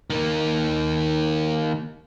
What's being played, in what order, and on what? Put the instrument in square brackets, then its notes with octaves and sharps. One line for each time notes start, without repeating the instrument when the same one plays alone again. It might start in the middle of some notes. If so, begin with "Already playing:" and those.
[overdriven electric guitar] D#3 A#3